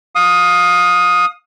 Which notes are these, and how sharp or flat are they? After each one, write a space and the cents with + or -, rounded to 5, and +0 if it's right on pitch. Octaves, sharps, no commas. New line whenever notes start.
F5 +25 D#6 +0